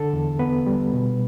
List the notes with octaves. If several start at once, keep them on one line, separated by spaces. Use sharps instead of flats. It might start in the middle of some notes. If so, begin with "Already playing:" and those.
Already playing: D3 A4
E2
B3 B4
G3
B2